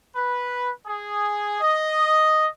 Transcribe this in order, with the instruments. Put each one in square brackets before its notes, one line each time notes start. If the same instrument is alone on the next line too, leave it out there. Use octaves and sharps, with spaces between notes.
[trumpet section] B4
G#4
D#5